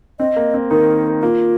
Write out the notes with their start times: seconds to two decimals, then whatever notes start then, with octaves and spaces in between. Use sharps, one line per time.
0.19 C4 D#5
0.37 A#3
0.54 C4
0.71 D#3 D#4 A#4
1.22 A#3 F4